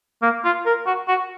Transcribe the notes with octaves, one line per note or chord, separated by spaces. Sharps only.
A#3
F4
A#4
F#4
F#4